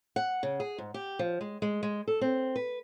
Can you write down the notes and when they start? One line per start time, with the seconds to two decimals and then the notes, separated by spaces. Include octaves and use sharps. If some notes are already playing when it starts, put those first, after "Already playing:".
0.16 F#5
0.43 C#3
0.60 G#4
0.78 G#2
0.94 G4
1.19 F3
1.41 G#3
1.62 G#3
1.83 G#3
2.08 A4
2.21 C4
2.56 B4